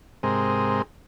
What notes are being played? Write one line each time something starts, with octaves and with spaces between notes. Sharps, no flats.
G#2 C3 G#3 C4 A#4 D#5